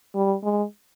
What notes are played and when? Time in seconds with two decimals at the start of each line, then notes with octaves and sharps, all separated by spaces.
0.15 G3
0.43 G#3